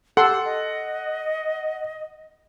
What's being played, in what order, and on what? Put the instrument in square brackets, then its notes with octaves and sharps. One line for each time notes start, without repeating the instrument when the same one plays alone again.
[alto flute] G4 [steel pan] A4 C6 [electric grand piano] F#5
[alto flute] D#5